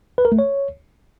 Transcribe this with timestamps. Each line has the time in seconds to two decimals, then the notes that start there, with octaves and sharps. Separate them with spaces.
0.18 B4
0.25 A#4
0.32 A3
0.39 C#5